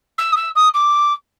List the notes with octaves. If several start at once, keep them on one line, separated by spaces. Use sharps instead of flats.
E6
D#6
E6
D#6
D6